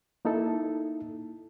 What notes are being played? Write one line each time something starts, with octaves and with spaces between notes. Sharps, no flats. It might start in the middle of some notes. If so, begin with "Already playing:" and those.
A#3 D#4 E4 A4